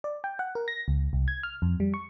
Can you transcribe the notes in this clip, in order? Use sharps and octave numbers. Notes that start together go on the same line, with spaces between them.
D5
G5
F#5
A#4
A#6
C#2
C2
G#6
F6
F2
G3
C#6